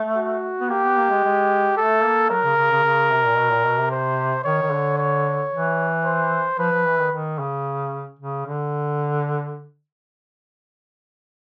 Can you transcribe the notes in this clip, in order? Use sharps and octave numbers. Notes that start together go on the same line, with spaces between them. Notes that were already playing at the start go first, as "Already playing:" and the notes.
Already playing: A3
F#4
B3
A#3 G4
B3
A#3
G#3
G#3
A3 A4
A#3
F#3 A#4
C#3
C#3
C#3
C#3
C3
A#2
B2
A#2
B2
C3
C5
D#3 C#5
D#3
D3
C#5
E3
C5
F3 B4
F3
E3
D#3
D#3
C#3
C#3
D3